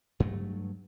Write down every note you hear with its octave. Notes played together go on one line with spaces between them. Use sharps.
G2 F#3 A3